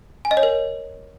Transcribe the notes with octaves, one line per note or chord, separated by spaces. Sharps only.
G#5
D#5
C#5
A#4